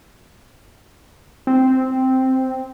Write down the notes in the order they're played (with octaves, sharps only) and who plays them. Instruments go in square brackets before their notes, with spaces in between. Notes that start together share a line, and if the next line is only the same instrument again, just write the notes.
[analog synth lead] C4